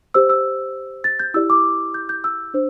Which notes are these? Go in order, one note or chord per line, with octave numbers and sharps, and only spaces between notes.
G4 C5 E6
E6
A6
G6
E4 G4 D5 E6
D6
G6
G6
E6
D4 C5